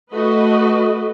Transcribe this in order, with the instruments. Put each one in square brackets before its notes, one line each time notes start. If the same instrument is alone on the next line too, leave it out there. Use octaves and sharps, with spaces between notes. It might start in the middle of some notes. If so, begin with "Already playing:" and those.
[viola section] A3 F#4 B4 D#5